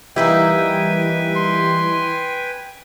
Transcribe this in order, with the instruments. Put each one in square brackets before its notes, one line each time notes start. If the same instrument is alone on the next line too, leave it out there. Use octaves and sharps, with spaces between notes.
[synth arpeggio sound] E3 G3 [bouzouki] A#3 D#4 E4 [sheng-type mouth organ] B4 G5 G#5
[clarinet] C6